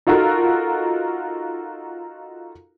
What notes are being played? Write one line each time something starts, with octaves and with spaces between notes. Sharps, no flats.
D#4 F4 F#4 A4 A#4